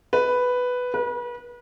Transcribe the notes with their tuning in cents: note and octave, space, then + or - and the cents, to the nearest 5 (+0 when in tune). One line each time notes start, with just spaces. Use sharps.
B4 +5
B4 -35